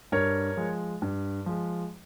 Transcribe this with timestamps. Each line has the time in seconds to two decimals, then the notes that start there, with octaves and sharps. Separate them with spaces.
0.12 G2 A#4 C#5
0.57 F3 G#3
1.02 G2
1.46 F3 G#3